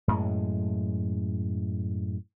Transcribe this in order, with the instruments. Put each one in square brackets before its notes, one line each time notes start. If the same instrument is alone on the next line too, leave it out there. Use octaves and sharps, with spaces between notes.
[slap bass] F#2 A2 G#3